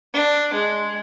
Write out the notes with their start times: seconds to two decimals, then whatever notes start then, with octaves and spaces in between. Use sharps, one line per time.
0.14 D4
0.53 G#3